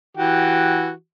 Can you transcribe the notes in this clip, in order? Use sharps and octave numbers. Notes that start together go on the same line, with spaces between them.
E3 F#4 G4